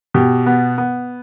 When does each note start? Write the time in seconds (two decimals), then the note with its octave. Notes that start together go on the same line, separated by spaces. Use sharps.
0.14 B2 G4
0.46 B3
0.78 B3